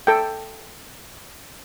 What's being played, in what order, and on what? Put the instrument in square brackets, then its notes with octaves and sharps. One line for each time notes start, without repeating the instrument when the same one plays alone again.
[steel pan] A4 G5